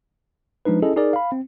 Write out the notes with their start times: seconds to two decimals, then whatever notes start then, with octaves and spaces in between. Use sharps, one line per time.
0.65 F3 G#3 D4 D#4 B4
0.82 C#4 E4 G#4 A4 D#5
0.96 D#4 G#4 A#4 D5
1.13 F5 B5
1.32 C4